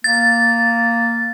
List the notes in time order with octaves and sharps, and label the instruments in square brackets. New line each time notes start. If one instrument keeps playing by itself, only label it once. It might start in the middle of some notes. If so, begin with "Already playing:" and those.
[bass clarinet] A#3 [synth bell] A6